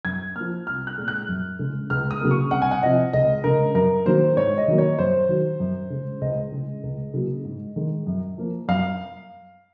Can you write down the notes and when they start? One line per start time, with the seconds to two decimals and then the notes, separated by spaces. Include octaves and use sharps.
0.05 F#2 G#6
0.36 F3 A#3 F6
0.67 C2 F6
0.87 F#6
0.98 A#2 G#3
1.08 F#6
1.28 F#2
1.59 C#3 G#3
1.90 C#2 F6
2.11 D#6
2.21 C#3 F#3 A#3
2.31 C#6
2.51 C2 F#5
2.62 G#5
2.71 F#5
2.83 C3 F3 D#5
3.13 C#2 D#5
3.44 C#3 G#3 A#4
3.75 F#2 A#4
4.05 D#3 F#3 A#3 C5
4.36 G#2 C#5
4.58 D#5
4.68 D#3 F#3 A#3
4.78 C#5
4.99 F#2 C5
5.29 D#3 F#3
5.60 F#2
5.90 C#3 G#3
6.21 C#2 D#5
6.52 C#3 G#3
6.83 C#2
7.14 C#3 F#3 A#3
7.45 G#2
7.76 D#3 G#3
8.07 F#2
8.38 F3 A#3
8.68 F#2 F5